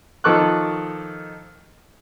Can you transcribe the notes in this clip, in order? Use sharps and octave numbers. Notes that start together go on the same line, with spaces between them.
D#3 F3 A4 C#6 D6 F#6